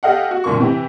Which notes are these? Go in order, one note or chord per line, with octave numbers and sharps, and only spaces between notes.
G4 A4 D#5 F5 F#5
F#4
C2 A#2 D3 A#3 C#6
C3 E3 G4